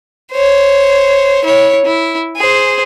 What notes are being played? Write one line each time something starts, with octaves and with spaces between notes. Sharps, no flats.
C5 C#5
E4 C#5
E4
G#4 C5